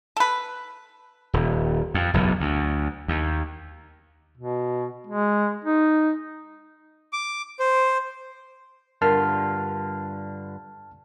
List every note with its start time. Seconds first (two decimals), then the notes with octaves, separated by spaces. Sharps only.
0.17 A4 B4
1.33 D#1
1.94 F2
2.14 F#1 B1 E2 G#2
2.40 D2
3.08 D#2
4.37 B2
5.07 G#3
5.65 D#4
7.13 D6
7.59 C5
9.02 G2 D3 F4 A#4 A5 F6